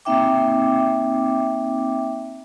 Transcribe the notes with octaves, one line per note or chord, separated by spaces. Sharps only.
A#3 C4 D#4 E5 G5 D6